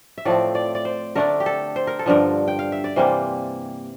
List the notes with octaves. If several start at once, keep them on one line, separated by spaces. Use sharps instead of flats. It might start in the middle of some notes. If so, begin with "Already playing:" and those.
E5
A2 F3 A3 C4 D5
D5
D5
C5
D3 A3 D4 A#4
G4
A4
C5
A#4
A4
G2 D3 F3 A#4
G5
F5
E5
D5
C3 E3 G3 A#3 C5